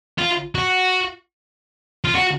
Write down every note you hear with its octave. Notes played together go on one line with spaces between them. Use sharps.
F4
F#4
F4
F#4